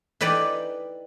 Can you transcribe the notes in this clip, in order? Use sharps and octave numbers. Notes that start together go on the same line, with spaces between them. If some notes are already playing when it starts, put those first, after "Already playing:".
E3 D#4 B4 D5 G5